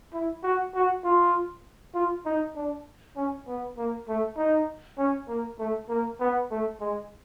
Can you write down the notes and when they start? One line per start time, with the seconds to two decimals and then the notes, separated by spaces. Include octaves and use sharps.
0.13 E4
0.43 F#4
0.75 F#4
1.04 F4
1.95 F4
2.25 D#4
2.56 D4
3.16 C#4
3.47 B3
3.77 A#3
4.08 A3
4.38 D#4
4.98 C#4
5.28 A#3
5.59 A3
5.89 A#3
6.20 B3
6.51 A3
6.80 G#3